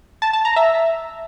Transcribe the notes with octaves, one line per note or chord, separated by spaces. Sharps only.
A5
A5
A#5
E5